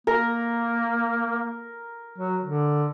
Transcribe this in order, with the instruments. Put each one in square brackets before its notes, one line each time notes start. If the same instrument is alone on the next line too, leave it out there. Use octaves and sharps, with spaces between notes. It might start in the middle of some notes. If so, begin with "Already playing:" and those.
[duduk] A#3 [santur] A#4
[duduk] F#3
D3